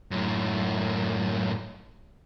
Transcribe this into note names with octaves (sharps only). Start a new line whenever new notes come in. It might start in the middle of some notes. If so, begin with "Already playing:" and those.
F#2 A2